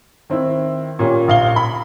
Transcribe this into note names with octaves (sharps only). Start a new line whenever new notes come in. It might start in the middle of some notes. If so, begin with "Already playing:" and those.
D#3 C4 E4
A#2 C#4 G4
A#1 F5 G7
B5